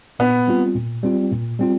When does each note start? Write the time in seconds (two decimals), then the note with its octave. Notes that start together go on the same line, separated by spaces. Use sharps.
0.19 A#2 B3
0.48 G3 C4 F4
0.75 A#2
1.03 G3 C4 F4
1.31 A#2
1.59 G3 C4 F4